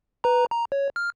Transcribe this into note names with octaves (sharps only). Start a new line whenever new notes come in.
B4 A#5
A#5
C#5
F6